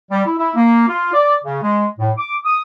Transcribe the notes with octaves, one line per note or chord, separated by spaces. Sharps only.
G3
E4
E4
A#3
F4
D5
C#3
G#3
A2
D6
D#6